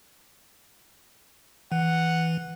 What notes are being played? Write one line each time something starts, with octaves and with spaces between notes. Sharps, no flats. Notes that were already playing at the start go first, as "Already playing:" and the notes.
E3 F#5